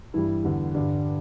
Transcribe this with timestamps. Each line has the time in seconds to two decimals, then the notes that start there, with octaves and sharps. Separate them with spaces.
0.14 G2 E3 G3 E4
0.44 E2 D3 G3
0.74 G2 D3 G3 D4